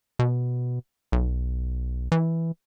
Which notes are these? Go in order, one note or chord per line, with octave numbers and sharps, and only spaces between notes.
B2
B1
E3